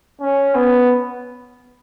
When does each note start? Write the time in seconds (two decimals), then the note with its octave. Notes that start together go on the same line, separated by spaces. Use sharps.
0.21 C#4
0.55 B3